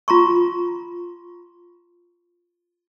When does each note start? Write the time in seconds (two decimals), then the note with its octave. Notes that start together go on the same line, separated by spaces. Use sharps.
0.08 F4 A#5 C6 C#6